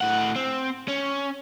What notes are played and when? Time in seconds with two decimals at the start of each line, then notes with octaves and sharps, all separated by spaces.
0.01 A2 F#5
0.36 C4
0.88 C#4